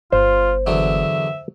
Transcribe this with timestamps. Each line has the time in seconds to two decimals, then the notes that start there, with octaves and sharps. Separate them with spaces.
0.12 G1 F4 C5
0.67 E2 D3 F#3 E5